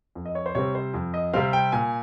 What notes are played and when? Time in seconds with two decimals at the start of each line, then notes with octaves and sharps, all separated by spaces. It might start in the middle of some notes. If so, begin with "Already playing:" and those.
0.15 F2
0.25 D#5
0.35 C#5
0.46 C5
0.55 C3 G3 C4 C#5
0.75 C5
0.94 F2
1.14 D#5
1.33 C3 G3 C4 F5
1.53 G5
1.72 A#2 G#5